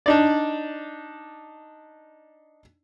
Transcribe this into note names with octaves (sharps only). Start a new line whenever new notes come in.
D4 D#4 D5